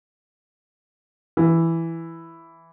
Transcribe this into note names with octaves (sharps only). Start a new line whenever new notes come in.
E3